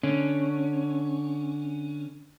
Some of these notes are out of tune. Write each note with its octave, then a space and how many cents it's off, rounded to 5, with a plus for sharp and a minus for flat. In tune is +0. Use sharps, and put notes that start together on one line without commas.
D3 +5 C#4 +0